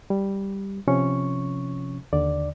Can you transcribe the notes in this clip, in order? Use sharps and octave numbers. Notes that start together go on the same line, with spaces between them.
G3
C3 F3 C#4 C#6
D#2 D3 D5